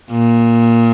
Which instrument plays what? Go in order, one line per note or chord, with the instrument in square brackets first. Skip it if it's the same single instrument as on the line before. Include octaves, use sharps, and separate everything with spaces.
[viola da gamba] A#2